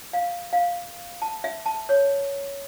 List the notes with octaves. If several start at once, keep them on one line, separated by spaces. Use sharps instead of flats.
F5
F5
A5
E5
A5
C#5